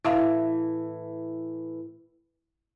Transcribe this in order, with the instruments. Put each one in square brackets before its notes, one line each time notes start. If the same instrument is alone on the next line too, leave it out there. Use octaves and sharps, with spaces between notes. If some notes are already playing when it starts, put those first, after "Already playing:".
[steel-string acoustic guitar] A2 E3 [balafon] E4 E5 F5